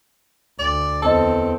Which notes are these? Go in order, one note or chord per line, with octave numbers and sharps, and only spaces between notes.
D2 D5
E2 C4 A4 D#5 A5